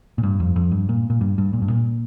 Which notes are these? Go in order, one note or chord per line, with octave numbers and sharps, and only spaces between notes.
A#2
G2
F2
F2
G2
A#2
A#2
G2
G2
A#2
G2
A#2